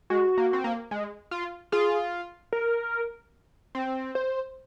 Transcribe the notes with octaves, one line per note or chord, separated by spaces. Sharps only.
G#3 F#4
A#3
C4
A#3
G#3
F4
F4 G#4
A#4
C4
C5